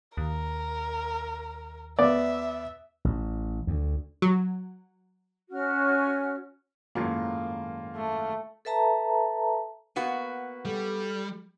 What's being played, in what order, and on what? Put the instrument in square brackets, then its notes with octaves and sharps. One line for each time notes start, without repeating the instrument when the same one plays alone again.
[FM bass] D#2 [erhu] A#4
[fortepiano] B3 D5 [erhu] E5
[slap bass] A1
D2
[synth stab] F#3
[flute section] C#4 F#4 F6
[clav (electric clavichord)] G#1 F#2 A2 [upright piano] A#3 F4
[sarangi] A3
[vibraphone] A4 B4 E5 A5 A#5
[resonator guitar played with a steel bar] A#3 B3 F#4
[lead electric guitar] G3 [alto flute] A4